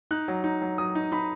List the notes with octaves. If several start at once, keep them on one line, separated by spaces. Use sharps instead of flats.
D#4 F#6
F#3
D#4
F#3
F#3 D#6
D#4
D#4 B5